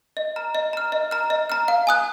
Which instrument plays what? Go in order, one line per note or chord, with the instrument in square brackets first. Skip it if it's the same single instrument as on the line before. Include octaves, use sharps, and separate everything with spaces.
[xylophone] D#5
A#5 F6
D#5
A#5 F6
D#5
A#5 F6
D#5
A#5 F6
F5
G#5 D#6 F#6